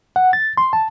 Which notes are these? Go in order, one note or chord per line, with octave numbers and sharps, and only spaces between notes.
F#5
A6
C6
A5